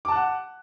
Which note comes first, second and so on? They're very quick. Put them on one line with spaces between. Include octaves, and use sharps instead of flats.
D6 A5 F#6 F#5